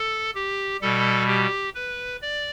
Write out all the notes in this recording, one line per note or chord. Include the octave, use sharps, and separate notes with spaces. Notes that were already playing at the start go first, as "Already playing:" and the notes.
Already playing: A4
G4
B2 G3 A4
G4
B4
D5